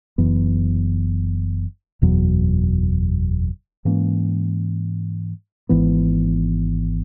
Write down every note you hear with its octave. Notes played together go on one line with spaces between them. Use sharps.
F#1 F#2 E3 B3
F#1 E2 B2 F#3
G#2 E3 A#3 C#4
G#1 G#2 E3 B3